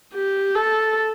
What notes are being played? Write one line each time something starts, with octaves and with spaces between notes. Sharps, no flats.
G4
A4